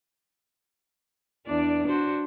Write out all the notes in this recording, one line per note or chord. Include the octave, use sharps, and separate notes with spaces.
E2 D4 D5
D4 F#4 C5